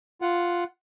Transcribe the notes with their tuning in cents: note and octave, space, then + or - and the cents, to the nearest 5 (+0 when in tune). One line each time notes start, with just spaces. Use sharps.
F4 +0 F#5 +0